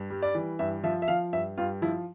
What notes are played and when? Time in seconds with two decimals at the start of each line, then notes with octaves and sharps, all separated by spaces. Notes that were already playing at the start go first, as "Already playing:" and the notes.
Already playing: G2
0.10 G3
0.23 D5
0.35 E3
0.59 G2 E5
0.83 F3 E5
1.02 E5
1.08 F3 F5
1.33 G2 E5
1.58 G2 F4
1.82 F3 E4